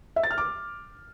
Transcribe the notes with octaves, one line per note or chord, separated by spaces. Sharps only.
E5
A6
F6
D6